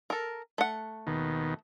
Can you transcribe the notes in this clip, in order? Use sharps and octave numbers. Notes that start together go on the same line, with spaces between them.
A4 A#4
A3 F#5
D#2 B2 D#3